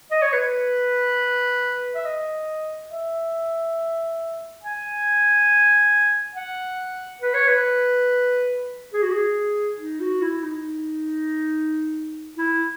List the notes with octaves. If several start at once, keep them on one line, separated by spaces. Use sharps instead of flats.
D#5
C#5
B4
E5
D#5
E5
G#5
F#5
B4
C#5
B4
G#4
F#4
G#4
D#4
F#4
E4
D#4
E4